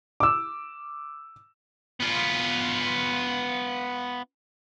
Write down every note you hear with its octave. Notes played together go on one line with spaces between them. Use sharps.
D6 E6
B3 F4